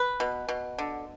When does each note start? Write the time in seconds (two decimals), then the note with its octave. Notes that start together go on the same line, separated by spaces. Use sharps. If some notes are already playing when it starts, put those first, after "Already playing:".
Already playing: B4
0.20 B2
0.49 B2
0.78 D3